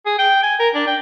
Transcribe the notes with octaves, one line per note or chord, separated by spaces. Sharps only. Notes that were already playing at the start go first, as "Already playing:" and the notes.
G#4
G5
G#5
A#4
D4
G5